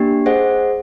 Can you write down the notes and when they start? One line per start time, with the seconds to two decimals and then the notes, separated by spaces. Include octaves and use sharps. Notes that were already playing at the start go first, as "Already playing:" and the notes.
Already playing: A#3 D4 G4
0.26 G#4 C5 D#5 F#5